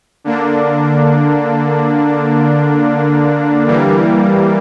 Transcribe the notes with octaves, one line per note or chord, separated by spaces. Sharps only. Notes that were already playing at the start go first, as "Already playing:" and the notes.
D3 A#3 D4
E3 G3 A#3